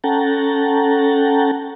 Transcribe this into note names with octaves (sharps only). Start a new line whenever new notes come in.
C#4 A4 F#5 G5 A5 A#5